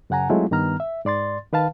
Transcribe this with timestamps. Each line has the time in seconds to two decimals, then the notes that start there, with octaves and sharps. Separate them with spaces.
0.10 F#2 C#3 F#5 G#5 A#5
0.30 F#3 G#3 A3 C4 E4 F4
0.51 G2 D#3 B3 A#5 F6
0.80 E5
1.05 G#2 D5 C6 A6
1.52 D#3 B4 F5 A5